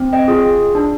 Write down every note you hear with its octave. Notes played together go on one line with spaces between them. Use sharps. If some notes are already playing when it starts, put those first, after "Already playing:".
Already playing: C4
D#5 G5
F4 G#4
D4